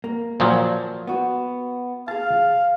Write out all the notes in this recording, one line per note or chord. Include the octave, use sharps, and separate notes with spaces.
A#3
A#2 F3 F#3
B3 F#4
G#4 F5 A5